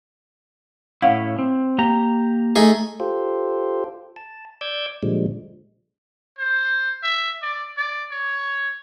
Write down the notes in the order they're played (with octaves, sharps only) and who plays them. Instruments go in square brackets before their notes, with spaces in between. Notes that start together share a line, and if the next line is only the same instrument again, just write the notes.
[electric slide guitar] A2 C#4 E4 [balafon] F5 F#5
[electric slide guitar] C4
A#3 G4 A#5
[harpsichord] A3 D#4 G#4
[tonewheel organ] F4 G4 A4 C5
A5
D5 D6 E6 G6 G#6
A#2 D3 F3 G3 G#3
[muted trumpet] C5
E5
D5
D5
C#5